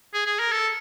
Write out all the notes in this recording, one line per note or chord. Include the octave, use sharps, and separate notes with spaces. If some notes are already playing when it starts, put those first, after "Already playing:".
G#4
G#4
A#4
A4